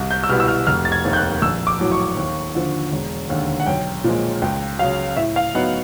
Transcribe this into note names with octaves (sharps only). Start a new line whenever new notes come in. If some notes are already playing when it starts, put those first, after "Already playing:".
Already playing: C2
G6
E6
B2 G3 B3 E4 F6
E6
F6
F1 F6
A6
G#6
D#2 D#3
G6
F#6
A#1 E6
D6
A2 F#3
C#6
D#2
D3 F3
E1
D#2 D3
F#5
B1 G5
A#2 F3 G#3
C#2 G5
C#3 F#3 F5
A2 E5
F5
F#3 B3 D#4 F#5